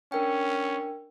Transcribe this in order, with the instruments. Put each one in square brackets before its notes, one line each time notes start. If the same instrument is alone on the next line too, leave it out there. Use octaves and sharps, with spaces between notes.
[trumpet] C#4 [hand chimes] D4 A#4 G5